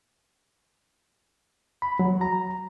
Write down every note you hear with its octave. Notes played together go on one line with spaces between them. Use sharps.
B5
F#3
A#5